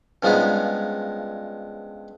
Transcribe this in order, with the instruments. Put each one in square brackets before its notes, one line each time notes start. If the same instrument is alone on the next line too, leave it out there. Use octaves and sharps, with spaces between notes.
[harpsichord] G2 C#3 F3 G#3 B3 D#4